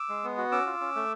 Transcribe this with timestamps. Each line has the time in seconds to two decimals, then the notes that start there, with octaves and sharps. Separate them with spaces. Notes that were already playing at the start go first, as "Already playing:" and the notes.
Already playing: D6 E6
0.09 G#3
0.24 B3
0.37 F#4
0.52 C#4 D6 E6
0.66 F4
0.81 C#4
0.96 A3